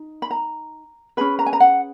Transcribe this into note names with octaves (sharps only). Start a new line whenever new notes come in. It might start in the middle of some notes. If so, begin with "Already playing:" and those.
Already playing: D#4
B5
A#5
C#4 G#4 B4 B5
A#5
G#5
A#5
F#5